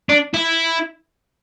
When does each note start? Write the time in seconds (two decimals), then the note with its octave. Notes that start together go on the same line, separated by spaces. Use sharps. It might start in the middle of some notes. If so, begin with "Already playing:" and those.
0.09 D4
0.34 E4